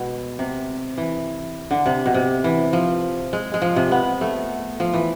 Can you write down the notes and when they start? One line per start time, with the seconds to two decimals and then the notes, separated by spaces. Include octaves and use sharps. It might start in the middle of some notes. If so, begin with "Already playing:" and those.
Already playing: B2 G#3
0.39 C3
0.98 E3
1.71 D3
1.86 C3
2.06 B2
2.14 C3
2.44 E3
2.73 F3
3.33 G#3
3.54 G#3
3.62 F3
3.76 C3
3.91 B3
4.21 A3
4.80 F3
4.93 E3